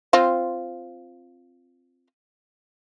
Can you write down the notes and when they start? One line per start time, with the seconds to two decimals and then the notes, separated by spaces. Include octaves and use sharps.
0.13 C4 F4 C5